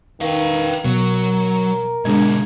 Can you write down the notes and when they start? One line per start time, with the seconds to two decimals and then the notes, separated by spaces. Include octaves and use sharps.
0.21 D#3 B4 F5
0.85 B2 F#3 A#4
2.05 B2 D3 G#3 D4 G#4 G#6